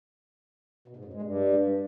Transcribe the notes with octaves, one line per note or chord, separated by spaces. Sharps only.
B2
G#2
F#2
G#3
G2